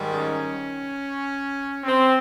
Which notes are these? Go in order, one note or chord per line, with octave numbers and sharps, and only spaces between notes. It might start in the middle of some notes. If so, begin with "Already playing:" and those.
Already playing: G#2 D#3 G3
C#4
C4